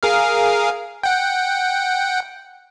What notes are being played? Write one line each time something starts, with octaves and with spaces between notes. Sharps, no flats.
G#4 A#4 F5
F#5 G5